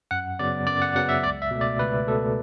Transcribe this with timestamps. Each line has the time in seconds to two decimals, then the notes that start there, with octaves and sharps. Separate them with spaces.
0.11 F#2 F#5
0.39 C#3 F#3 B3 D5
0.67 F#2 D5
0.82 F#5
0.95 C#3 F#3 B3 F#5
1.09 E5
1.24 C#2 D5
1.42 E5
1.51 B2 A3
1.61 D5
1.79 C#2 B4
2.07 B2 A3 A4